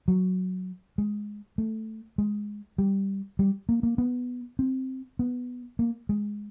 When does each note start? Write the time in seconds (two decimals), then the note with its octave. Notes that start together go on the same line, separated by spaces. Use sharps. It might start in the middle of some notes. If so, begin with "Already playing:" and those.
0.08 F#3
0.98 G#3
1.58 A3
2.18 G#3
2.78 G3
3.39 G3
3.69 A#3
3.83 A#3
3.98 B3
4.59 C4
5.19 B3
5.79 A#3
6.09 G#3